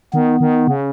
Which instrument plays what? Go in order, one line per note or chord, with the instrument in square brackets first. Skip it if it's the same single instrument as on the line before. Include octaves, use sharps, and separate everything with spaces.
[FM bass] D#3 [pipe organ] B3
[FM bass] D#3
C#3